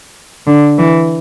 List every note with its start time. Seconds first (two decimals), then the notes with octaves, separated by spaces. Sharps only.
0.47 D3
0.78 E3